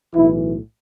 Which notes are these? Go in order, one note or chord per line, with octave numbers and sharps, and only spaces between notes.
B1 A2 E3 E4